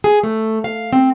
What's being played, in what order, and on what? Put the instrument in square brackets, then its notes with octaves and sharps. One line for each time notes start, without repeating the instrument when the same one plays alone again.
[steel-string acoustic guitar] G#4
A3
F5
C4